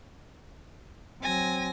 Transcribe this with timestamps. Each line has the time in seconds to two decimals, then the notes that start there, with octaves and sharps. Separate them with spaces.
1.22 F#3 C4 G#5 A#6